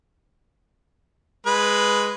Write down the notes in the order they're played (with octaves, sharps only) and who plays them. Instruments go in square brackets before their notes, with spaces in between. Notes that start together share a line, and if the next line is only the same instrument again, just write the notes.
[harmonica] G#3 B4